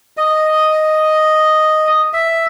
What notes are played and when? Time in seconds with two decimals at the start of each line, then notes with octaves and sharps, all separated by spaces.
0.17 D#5
2.13 E5